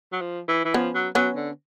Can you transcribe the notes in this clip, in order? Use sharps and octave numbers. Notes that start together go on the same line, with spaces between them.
F#3
F3
E3
E3
F3 B3 C#4
F#3
F#3 B3 C#4
D3